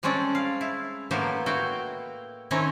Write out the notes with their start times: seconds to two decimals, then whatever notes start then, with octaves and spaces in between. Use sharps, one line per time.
0.03 G3 G#3 C4 C#4 A4 D5
0.35 F5
0.61 E4
1.11 A2 F#3 A#3 B3 G4 C5
1.46 E4 F#4 F5 G5
2.51 D#3 C4 C#4 E4 D#5 A#5